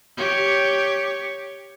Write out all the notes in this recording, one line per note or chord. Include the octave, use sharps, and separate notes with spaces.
G4 C#5